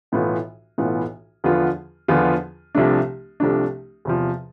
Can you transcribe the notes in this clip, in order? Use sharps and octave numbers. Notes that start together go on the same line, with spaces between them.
B1 A2 E3 B3 F4
B1 A2 E3 B3 F4
E2 D3 F3 B3 F4
E2 D3 F3 B3 F4
C2 C3 F3 A3 D4
C2 C3 F3 A3 D4
E2 C3 F3